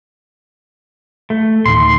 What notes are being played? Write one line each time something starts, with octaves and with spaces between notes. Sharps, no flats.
A3
D1 D#3 C6